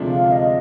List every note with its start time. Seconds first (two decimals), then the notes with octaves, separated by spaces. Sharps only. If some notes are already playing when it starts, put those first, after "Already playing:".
Already playing: D2 C3 F3 G#3 D4
0.11 F5
0.32 D#5